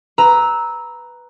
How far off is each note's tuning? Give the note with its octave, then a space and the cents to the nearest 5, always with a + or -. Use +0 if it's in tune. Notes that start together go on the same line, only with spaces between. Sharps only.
B4 +0 A#5 +5 E6 -15